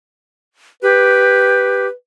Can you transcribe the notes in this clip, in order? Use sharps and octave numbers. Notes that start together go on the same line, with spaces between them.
G4 B4